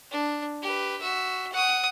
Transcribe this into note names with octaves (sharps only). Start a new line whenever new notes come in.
D4
G4 B4
F#4 E5
F#5 D#6